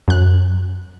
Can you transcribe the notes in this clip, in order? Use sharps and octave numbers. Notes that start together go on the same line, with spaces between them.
F#2 F#6